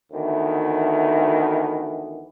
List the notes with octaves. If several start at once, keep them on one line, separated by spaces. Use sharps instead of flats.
D2 D#3 E3 B3